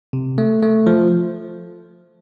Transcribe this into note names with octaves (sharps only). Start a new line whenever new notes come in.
C3
A3
A3
F3